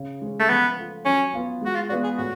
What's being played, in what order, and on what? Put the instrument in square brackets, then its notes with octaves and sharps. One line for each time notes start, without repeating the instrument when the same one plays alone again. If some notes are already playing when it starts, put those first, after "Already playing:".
Already playing: [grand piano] C#3
G#3 C#4
[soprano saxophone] A3
[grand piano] F3 [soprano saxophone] B3
[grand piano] A3 F4
[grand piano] F#3 [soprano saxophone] C#4
[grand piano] B3 F4 B4
[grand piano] G#3 [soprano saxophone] F#4
[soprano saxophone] F4
[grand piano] B3 F4 B4 D5 [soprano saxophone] F#4
[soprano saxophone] G#4
[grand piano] A2 [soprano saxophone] F#4